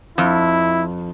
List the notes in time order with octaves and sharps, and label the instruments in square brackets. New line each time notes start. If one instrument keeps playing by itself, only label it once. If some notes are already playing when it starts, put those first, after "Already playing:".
[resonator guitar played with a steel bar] F2 [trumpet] E4